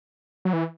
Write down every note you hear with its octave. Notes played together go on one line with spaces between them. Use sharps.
F#3
E3